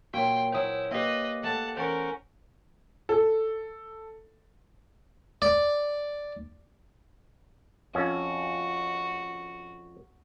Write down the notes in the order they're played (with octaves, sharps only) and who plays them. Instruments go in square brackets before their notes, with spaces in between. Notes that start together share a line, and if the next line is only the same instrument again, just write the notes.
[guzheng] A#2 F#3 [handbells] A#3 F#4 [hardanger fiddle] G5 C6
[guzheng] F#3 G#5 [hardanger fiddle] E4 [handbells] C5 D#6 E6
[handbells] A#3 G4 [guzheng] C4 C#5 [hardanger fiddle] B4 D#5
[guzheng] A3 C4 E5 [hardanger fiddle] F#5 A5
[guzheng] E2 [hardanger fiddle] C#4 A#4 [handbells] C5 F#5 C#6
[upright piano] A4
[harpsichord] D5
[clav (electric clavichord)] F2 C#4 [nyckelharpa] F#4